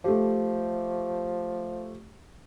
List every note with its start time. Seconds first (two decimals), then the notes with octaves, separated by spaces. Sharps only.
0.04 F3 A3 G4